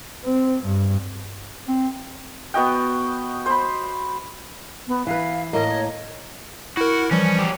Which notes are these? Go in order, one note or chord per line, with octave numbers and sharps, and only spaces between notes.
C4
G2
C4
B3 F#4 D#5 G5
C5 B5
B3
E3 B4 F5
A2 A#3 A#4 D#5
C#5
E4 F#4 A#4
E3 F3 G3 C#4
F#3 G4